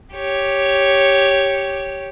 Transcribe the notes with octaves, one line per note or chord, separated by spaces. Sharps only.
G4 C#5